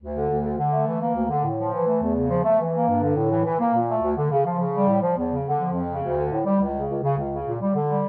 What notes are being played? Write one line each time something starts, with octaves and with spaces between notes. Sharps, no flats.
D2
D3
D2
D3
D3
A3
E3
A#3
D2
D3
A2
F3
E3
A3
E2
C#3
F3
A3
E3
A#3
G2
D3
A2
E3
E3
A#3
A#2
A3
D2
D3
C#3
F3
C#3
G3
A2
F3
E2
C#3
D3
F3
F2
C#3
D2
D3
A2
G3
C#2
C#3
C#2
C#3
C#2
C#3
A#2
G3
D3
G3